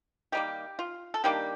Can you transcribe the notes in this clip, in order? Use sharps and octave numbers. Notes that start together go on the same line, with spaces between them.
D#3 G3 A#3 G4
F4
A4
D#3 G3 A#3 D4 G4